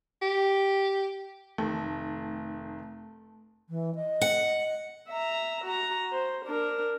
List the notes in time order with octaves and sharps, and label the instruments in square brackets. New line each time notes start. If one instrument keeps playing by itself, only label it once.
[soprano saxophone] G4
[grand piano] F1 D#3 [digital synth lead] A3
[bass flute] E3
D#5
[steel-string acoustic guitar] F#5
[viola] E5 A#5
F#4 A#5
C5
D4 A#4